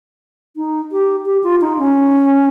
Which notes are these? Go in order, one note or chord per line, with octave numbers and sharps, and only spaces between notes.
D#4
G4
G4
F4
D#4
C#4